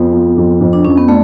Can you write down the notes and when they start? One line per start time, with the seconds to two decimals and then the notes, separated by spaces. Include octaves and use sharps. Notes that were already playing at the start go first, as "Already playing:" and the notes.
Already playing: F2 F3 B3
0.13 F3
0.37 F2
0.61 F2
0.73 D4
0.85 F2 C#4
0.97 B3
1.08 A3 D4